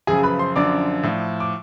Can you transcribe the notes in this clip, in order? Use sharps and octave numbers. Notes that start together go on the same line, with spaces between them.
F#2 C#3 F3 G#4 G#5
B4 B5
C5 C6
F#2 D3 F3 D5 D6
A2 F3
D6